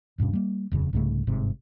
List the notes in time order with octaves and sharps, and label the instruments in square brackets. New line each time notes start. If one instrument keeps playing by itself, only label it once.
[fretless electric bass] D#1 G2 B2 C#4
G3 A#3
D#1 F2 C#3
C2 G#2 C#3 A3
G1 G#2 C3